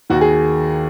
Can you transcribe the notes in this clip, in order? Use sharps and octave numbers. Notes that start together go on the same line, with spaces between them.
D#2 D#3 F#4
G#4